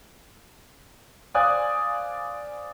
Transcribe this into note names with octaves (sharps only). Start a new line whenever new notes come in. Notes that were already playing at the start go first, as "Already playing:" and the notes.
C5 D5 F5 G#5 D#6 F#6